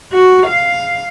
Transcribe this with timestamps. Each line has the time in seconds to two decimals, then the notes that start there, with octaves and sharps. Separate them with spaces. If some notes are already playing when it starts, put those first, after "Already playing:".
0.13 F#4
0.46 F5